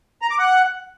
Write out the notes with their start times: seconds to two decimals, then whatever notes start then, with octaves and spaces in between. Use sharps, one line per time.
0.22 A#5
0.30 D6
0.39 F#5